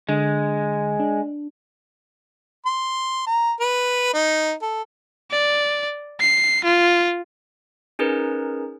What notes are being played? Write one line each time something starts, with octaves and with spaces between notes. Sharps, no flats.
D3 G#3
D4
C6
A#5
B4
D#4
A4
D5
C7
F4
C#4 D#4 G#4 A#4 B4